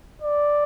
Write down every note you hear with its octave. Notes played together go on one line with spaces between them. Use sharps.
D5